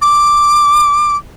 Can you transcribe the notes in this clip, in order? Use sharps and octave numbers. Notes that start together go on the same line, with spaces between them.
D6